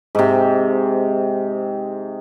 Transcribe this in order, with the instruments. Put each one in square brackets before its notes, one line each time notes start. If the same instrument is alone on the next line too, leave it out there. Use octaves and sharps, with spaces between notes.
[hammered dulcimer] G#2 C3